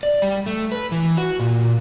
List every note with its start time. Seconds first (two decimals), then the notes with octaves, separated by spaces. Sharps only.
0.03 D5
0.22 G3
0.46 A3
0.72 B4
0.92 E3
1.17 F#4
1.40 A#2